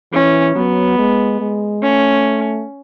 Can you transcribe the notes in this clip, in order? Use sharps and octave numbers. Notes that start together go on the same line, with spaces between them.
E3 C#4
F#3 B3
G#3
G#3
A3 C#4